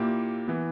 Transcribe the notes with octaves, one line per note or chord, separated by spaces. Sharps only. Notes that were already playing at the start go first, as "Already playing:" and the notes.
Already playing: A#2 A#3 E4 G4
E3 B3